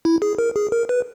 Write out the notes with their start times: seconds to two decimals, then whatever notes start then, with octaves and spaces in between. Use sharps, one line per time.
0.05 E4
0.22 G#4
0.38 A#4
0.56 G#4
0.72 A#4
0.89 B4